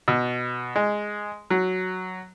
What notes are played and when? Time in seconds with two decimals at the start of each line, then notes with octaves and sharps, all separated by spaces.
0.08 B2
0.76 G#3
1.50 F#3